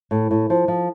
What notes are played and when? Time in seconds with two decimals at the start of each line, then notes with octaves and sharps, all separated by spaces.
0.11 A2
0.31 A2
0.50 F3
0.68 F3